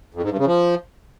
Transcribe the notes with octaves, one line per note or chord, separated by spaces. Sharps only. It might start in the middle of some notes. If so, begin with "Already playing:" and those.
F2
G#2
G2
C#3
F3